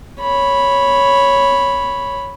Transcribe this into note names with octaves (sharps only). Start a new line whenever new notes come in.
C#5 B5